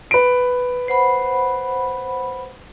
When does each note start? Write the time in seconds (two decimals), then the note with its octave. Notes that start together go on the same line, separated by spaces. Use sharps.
0.11 B4 D7
0.88 C5 F#5 B5